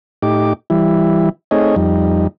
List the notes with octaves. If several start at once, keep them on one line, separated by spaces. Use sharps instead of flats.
A2 D#4 G4 D6
E3 G3 E4
A3 C4 D#4 G#4 C#5 D#5
F2 G3 D#4